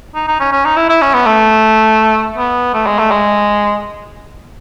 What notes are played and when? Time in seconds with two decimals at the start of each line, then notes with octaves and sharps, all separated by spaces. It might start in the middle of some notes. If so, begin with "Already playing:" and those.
0.15 D#4
0.28 D#4
0.40 C#4
0.52 C#4
0.65 D#4
0.77 E4
0.89 E4
1.02 C#4
1.14 B3
1.26 A3
2.37 B3
2.74 A3
2.86 G#3
2.99 A3
3.11 G#3